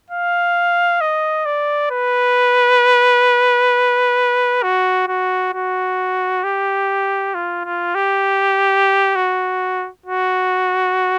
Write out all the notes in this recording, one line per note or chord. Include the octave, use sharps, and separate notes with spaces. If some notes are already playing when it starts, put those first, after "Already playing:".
F5
D#5
D5
B4
F#4
F#4
F#4
G4
F4
F4
G4
F#4
F#4